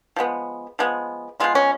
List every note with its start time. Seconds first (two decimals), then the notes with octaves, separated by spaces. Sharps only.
0.16 F3 G#3 B3
0.79 F3 G#3 B3
1.40 F3 G#3 B3 F4
1.55 C#4